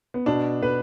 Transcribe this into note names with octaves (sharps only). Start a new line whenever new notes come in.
B3
B2 D4
B2 B4